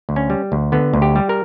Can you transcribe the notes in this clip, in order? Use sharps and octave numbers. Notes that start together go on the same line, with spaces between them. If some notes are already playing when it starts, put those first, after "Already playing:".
D2
C#4
G3
D2
D3 B3
D2
G4
G3
A#4